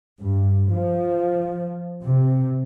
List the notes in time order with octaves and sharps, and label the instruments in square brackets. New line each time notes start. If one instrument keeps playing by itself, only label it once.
[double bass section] G2
F3
C3